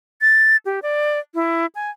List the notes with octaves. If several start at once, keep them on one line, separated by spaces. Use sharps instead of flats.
A6
G4
D5
E4
G#5